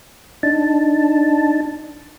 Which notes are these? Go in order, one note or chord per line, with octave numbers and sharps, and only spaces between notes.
D4 D#4 A5